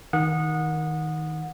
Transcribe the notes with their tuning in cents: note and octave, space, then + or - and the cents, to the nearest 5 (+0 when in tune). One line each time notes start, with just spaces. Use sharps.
D#3 +15 F#5 -25 D#6 -15